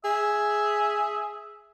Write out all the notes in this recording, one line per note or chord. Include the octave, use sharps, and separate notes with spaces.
G#4 E5